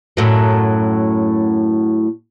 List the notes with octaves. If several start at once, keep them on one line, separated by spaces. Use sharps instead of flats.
F#2 A2 F#3